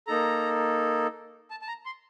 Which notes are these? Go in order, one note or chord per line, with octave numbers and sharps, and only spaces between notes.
A#3 D#4 A4 A#5
A5
A5
A#5
C6